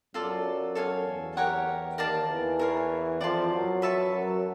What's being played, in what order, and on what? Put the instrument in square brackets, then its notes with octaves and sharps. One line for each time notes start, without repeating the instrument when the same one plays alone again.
[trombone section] F#2 F#3 [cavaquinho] F4 A4 D5
[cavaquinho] A4 C#5 F5 G#5
[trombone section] E2 E3
[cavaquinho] G4 A#4 C#5 F#5
[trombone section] D#2 D#3 [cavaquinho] A#4 D5 F5 A5
[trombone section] E2 E3
[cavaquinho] A#4 C#5 F5
[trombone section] F2 F3 [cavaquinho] D5 F#5 A5 C6
[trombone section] F#2 F#3
[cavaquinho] B4 E5 A5 C#6
[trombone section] F#2 F#3